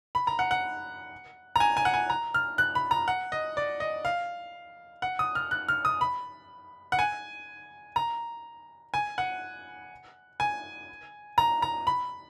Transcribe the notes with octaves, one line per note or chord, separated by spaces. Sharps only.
B5
A#5
F#5
F#5
A#5
G#5
G#5
F#5
G#5
A#5
F6
F#6
B5
A#5
F#5
D#5
D5
D#5
F5
F#5
D#6
F6
F#6
F6
D#6
B5
F#5
G#5
A#5
G#5
F#5
G#5
A#5
A#5
B5